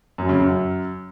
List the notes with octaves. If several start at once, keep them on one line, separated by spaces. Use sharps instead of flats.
F#2
C#3
F#2